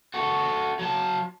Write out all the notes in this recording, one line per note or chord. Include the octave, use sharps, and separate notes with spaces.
F#4 A4
F#3 A5